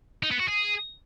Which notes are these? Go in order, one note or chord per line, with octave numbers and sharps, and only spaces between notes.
D#4
B3
F#4
G#4